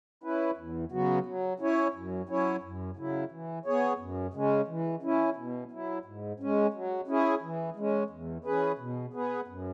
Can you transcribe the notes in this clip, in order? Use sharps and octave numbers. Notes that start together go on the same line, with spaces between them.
C#4 E4 B4
E2
C#3 F#3 B3 F#4
F#3
C#4 E4 C#5
F#2
F#3 C#4 E4 C#5
F#2
C#3 F#3 E4
E3
B3 G#4 C#5
F#2
C#3 G#3 C#4
E3
C#4 E4
B2
F#3 E4
G#2
G#3 C#4
F#3
C#4 E4 G#4
E3
G#3 C#4
E2
E3 C#4 G#4 B4
B2
B3 G#4 B4
F#2